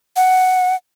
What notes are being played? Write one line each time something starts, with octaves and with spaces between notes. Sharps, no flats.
F#5